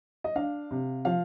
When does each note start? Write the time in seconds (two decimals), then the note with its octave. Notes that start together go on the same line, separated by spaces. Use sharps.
0.24 D#5
0.36 D4 F5
0.71 C3
1.05 F3 F5